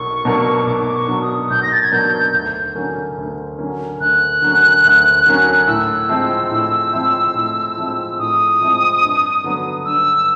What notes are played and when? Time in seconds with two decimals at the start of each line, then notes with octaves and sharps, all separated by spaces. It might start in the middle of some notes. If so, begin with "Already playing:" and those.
Already playing: B1 B2 A#3 C#6
0.25 B2 F#3 A#3 D4
0.66 B1 D6
0.95 C#6
1.08 B2 F#3 A#3 D4
1.21 D#6
1.50 B1 G6
1.63 A#6
1.72 A6
1.82 G#6
1.92 B2 F#3 A#3 D4 G6
2.34 D2
2.75 D3 F#3 A#3 C#4
3.18 D2
3.58 D3 F#3 A#3 C#4
4.00 D2 F#6
4.42 D3 F#3 A#3 C#4
4.85 D2
5.26 D3 F#3 A#3 C#4
5.67 A2 E6
6.09 F3 G#3 C4 E4
6.51 A2
6.93 F3 G#3 C4 E4
7.35 A2
7.77 F3 G#3 C4 E4
8.19 A2 D#6
8.61 F3 G#3 C4 E4
9.02 G2
9.44 D3 F#3 B3
9.86 G2 E6